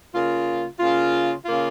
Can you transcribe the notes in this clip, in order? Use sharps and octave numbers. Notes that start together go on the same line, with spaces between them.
C#3 A#3 F4
C#3 A#3 F4
C#3 A#3 F4